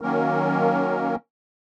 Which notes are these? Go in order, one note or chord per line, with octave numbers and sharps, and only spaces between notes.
D#3 F#3 A#3 C#4 A#4